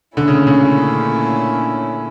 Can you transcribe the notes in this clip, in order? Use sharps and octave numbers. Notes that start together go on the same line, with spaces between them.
A#2 D3 A3 C#4 E4
C#3
C#3